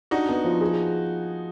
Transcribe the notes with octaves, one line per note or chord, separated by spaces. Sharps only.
D4 D#4 F#4
B3
F3
G#4